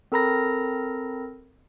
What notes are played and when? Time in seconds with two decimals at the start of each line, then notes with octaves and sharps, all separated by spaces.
0.12 C4 A4 A#4 A#5 B5 A#6